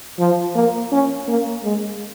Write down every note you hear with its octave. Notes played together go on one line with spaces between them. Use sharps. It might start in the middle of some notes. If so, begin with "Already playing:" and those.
F3
A#3
C#4
A#3
G#3